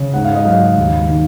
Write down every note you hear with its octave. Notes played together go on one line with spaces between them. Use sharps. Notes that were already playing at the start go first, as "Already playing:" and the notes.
Already playing: C#3
G#2 F#5
F5
D#5
F#3 F5
D#2
D#3